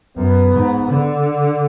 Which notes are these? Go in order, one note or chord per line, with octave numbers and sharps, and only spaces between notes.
F#2 B3
G#2
D3